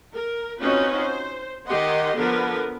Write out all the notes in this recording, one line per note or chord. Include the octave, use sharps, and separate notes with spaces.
A#4
C4 C#4 D#4 F4 F#4 B4
C5
D#3 G4 D#5 F#5 C6
D3 F3 B3 A#4 B4